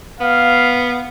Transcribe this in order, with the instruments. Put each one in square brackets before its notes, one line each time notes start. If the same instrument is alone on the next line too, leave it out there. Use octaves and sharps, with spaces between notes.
[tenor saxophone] B3 [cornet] F5